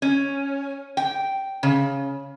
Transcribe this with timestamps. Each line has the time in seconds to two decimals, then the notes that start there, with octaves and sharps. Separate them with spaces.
0.02 C#4
0.97 G5
1.63 C#3